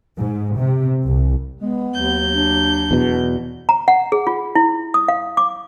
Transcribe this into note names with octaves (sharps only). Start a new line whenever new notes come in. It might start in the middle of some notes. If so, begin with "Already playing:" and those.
G#2
C3
C2
G#3 B3
D#2 F#3 G6
D4
E2 B2
A#5
F#5
G#4
F4
E4
D#6
F5
D6